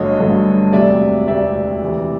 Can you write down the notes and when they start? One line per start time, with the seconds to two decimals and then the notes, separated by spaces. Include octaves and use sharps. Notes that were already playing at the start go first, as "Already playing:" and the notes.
Already playing: G1 G2 D3 F#3 A3 C#5 D#5
0.19 G1 G2 D3 F#3 A3
0.73 E1 D2 C3 D5 E5
1.27 E1 D2 C3 D5 E5
1.82 D2 C3 E3